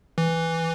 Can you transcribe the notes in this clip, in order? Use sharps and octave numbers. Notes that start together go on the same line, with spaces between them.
E3